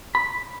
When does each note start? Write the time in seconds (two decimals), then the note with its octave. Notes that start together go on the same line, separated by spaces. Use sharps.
0.15 B5